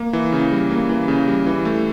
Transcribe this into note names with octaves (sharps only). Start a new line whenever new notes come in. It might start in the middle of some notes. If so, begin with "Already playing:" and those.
Already playing: A#3
E3
C#3
G3
A#3
E3
C#3
G3
E3
A3